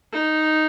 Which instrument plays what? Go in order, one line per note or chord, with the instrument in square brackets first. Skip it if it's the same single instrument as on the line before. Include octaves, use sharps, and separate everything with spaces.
[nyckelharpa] D#4